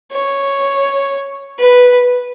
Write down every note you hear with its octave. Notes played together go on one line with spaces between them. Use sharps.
C#5
B4